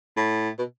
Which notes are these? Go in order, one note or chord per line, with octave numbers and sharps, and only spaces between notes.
A2
B2